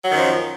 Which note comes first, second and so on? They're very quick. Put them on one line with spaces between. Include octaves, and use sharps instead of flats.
F#3 D#3 F#2 F3